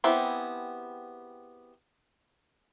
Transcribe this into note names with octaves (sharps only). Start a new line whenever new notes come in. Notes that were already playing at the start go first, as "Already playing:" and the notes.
B3 C4 E4 G4 G#4